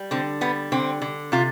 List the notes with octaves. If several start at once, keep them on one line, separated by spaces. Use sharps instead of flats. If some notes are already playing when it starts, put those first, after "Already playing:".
Already playing: G3
D3 C4
G3 B3
D3 C4
D3
C3 F4